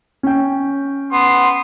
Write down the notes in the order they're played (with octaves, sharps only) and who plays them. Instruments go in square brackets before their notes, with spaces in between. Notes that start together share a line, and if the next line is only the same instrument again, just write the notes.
[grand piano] C#4 G5
[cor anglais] B3 [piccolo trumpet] C6